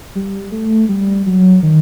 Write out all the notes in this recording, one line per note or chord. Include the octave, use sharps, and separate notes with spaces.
G3
A3
G3
F#3
D#3